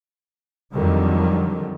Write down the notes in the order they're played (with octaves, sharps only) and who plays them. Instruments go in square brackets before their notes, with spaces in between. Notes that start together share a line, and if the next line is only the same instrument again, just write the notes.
[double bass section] F2 D3 D#3 F#3 G3